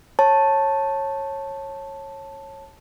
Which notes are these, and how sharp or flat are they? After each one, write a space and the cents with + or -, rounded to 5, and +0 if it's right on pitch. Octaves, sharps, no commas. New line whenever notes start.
C#5 -20 A5 +0